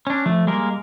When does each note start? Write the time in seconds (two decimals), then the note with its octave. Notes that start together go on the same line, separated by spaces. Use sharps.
0.07 C#4 D4
0.26 F3 A3
0.47 G3 G#3 A#3 A#4